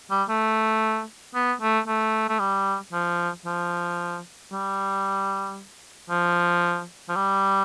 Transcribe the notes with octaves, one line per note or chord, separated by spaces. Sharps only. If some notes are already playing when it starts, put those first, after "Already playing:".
G3
A3
B3
A3
A3
A3
G3
F3
F3
G3
F3
F3
G3